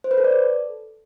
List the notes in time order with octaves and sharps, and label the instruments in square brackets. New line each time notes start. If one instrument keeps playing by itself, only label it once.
[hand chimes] C5
B4
A4
D5
A4